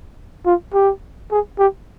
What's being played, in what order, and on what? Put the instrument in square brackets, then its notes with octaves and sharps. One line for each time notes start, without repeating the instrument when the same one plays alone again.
[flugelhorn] F4
G4
G#4
G4